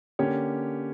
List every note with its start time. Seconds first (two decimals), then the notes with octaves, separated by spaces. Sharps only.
0.19 D3 A#3 C#4 G4 C#5